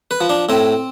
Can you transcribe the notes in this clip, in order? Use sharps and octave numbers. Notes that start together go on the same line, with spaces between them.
B4
F3
D4
A2 C4